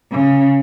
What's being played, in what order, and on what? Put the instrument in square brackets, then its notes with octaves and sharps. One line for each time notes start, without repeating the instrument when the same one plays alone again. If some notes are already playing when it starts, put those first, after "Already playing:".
[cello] C#3